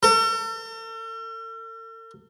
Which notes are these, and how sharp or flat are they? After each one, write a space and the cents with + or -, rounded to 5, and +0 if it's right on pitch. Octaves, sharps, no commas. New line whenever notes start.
A4 +45